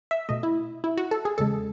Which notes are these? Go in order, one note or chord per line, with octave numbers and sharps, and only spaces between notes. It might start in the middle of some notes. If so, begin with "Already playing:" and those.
E5
B2 A3 D#5
E4
E4
F#4
A4
G#4
E2 C#3 G#3 A4